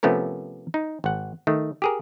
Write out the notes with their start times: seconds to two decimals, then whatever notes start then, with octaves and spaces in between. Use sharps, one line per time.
0.03 C3 F3 A3 B3 C#4 A#4
0.74 D#4
1.04 G#1 F#5
1.47 D#3 A3
1.82 G4 G#4 A#4